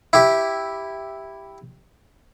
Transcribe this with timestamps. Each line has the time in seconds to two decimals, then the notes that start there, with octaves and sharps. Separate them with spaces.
0.13 E4 G4